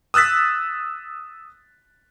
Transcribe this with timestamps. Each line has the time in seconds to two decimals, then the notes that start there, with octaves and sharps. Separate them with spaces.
0.14 D#6 E6 F#6 A6 B6